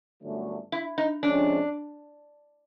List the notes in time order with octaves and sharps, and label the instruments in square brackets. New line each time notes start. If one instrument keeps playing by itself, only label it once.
[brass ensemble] G1 F#2 D3 F#3 A3
[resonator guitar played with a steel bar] E4
D#4
[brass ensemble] F2 C3 F3 G#3 C#4 [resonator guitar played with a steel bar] D4